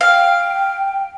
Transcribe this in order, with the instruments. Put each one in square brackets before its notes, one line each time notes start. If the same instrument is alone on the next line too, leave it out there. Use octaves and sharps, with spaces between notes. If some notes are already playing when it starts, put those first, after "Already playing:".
[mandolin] F5 [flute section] G5